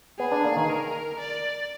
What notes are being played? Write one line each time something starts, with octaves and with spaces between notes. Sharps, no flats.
B3 G#4
D4
A#3
D#3
A#4
D5